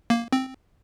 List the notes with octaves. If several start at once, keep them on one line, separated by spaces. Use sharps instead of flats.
A#3
C4